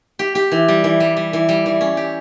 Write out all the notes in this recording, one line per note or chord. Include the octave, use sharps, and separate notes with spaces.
G4
G4
E3
G3
E3
G3
G3
E3
G3
E3
C#4
G4